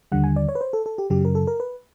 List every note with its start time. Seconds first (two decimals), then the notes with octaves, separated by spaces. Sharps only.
0.12 D#2 D3 G3 F#5
0.24 G#5
0.36 D5
0.49 C#5
0.55 B4
0.61 C5
0.73 A4
0.86 A4
0.98 G4
1.10 F#2 C#3 F#3 G4
1.25 A#4
1.35 A4
1.47 A#4
1.60 B4